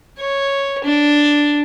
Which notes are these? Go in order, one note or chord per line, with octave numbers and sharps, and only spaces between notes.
C#5
D4